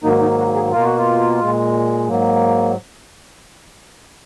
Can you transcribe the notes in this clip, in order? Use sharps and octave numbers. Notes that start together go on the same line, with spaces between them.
G#2 D#3 F#3 A#3 D#4
D#4
F#4
G#4
B2 A#3 F4
F#4
F4
A#2 G#3
G#2 F#3 A#3